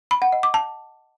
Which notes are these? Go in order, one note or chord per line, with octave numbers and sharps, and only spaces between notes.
B5
F#5
D#5
D6
A5